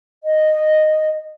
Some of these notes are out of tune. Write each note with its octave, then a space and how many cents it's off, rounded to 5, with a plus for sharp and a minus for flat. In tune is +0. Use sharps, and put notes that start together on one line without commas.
D#5 -10